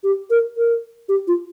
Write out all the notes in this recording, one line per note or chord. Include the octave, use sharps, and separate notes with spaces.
G4
A#4
A#4
G4
F4